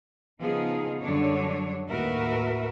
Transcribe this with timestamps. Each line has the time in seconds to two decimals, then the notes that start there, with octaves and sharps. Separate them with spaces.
0.41 C#3 F3 B3 D#4 G#4
1.01 F#2 D3 F#3 G3 D4 C#5
1.88 D#2 A2 F#4 A#4 B4 E5